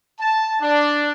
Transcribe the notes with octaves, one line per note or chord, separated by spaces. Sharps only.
A5
D4